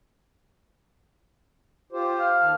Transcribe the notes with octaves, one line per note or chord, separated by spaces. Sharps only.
F4 G4 C5
F5
D#2 D#3 A5